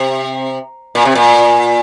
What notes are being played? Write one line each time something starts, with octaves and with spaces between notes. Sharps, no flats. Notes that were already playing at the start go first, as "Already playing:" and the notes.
Already playing: C3
A#2
C3
A#2